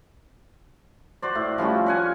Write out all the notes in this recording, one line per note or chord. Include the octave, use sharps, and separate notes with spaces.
F#4 C5 D5
A2
F3 G3 C#4 F#4
C#4 F#5 G#5